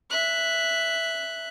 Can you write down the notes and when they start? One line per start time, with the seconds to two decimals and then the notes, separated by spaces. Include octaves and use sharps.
0.11 E5 F#6